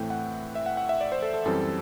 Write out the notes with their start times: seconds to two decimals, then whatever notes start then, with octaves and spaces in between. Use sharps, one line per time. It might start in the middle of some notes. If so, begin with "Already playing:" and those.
Already playing: A2 E3 A3 C4 G5
0.10 F#5
0.55 E5
0.66 F#5
0.77 F#5
0.89 E5
1.01 D5
1.12 C5
1.22 A4
1.34 A4
1.46 F#2 E3 G3 C4 A4